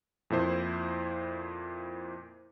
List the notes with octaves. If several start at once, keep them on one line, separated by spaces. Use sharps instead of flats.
F2 A#2 E4 C5